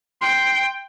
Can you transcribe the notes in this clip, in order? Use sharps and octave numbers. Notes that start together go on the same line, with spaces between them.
G5 C6